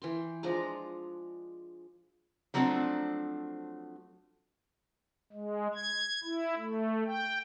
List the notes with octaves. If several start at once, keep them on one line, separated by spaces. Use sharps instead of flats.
E3 G5 C6
F3 G#3 D4 A#5
F3 F#3 A3 C4 D4
G#3
G#6
E4
A3
G5